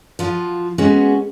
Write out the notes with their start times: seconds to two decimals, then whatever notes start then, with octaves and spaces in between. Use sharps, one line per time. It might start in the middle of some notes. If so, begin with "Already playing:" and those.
0.19 F3 F4 F#4
0.78 G#3 B3 C#4 F#4 G#4